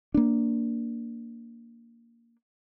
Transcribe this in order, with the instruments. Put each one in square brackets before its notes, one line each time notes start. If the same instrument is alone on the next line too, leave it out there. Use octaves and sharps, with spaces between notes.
[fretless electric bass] A#3 D4